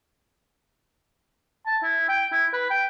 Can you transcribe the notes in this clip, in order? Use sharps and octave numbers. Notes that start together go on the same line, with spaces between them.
A5
E4
G5
E4
B4
G5